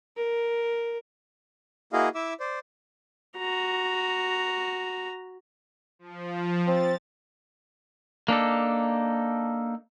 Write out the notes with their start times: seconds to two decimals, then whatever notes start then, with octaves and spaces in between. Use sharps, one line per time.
0.17 A#4
1.93 A#3 E4 F#4 G#4 D#5 F5
2.15 E4 E5 D6 E6
2.40 C5 D5
3.37 F#4 A#5
5.99 F3
6.67 C4 A6
8.28 A#3 D4 D#4 A4